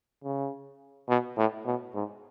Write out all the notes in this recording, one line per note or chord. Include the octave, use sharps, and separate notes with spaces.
C#3
B2
A2
B2
G#2